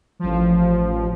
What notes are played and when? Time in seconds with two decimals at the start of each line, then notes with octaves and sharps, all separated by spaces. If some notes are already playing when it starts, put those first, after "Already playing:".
0.19 A1 F3